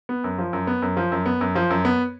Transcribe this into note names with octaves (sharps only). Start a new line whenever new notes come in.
B3
F#2
F3
F#2
B3
F#2
F3
F#2
B3
F#2
F3
F#2
B3